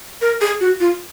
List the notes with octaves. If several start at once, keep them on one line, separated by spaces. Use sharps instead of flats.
A#4
G#4
F#4
F4